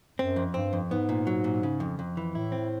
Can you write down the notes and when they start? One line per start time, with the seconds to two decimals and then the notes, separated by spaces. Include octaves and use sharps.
0.19 F#2 C4
0.36 F2
0.54 G2 C4
0.73 F2
0.91 G#2 B3
1.09 A#2
1.27 F#3
1.44 A#2
1.63 C#3
1.80 F2
1.99 F2
2.17 E3
2.35 A2 E4
2.52 C4